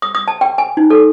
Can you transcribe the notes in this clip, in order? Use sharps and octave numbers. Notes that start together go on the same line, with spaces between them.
D#6
D#6
A5
G5
G#5
D#4
A4